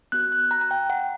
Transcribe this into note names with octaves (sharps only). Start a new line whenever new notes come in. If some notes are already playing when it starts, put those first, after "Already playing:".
B3 F#4 F#6
F#6
A#5
A#5
G5
F#5